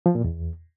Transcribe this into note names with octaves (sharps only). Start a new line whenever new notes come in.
F3
A#2
E2